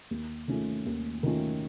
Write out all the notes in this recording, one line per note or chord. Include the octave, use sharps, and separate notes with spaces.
D#2
D#3 A3 C#4 F4
D#2
D#3 A3 C#4 F4